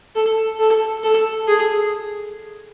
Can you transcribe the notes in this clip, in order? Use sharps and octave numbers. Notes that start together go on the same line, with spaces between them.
A4
A4
A4
G#4